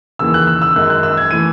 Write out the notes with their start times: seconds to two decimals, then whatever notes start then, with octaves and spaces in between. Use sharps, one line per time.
0.19 D#2 C#3 E3 E6
0.34 F#6
0.47 E6
0.62 E6
0.76 F#2 D#3 G#3 F#6
0.90 F#6
1.03 E6
1.17 G#6
1.31 E3 A3 D#7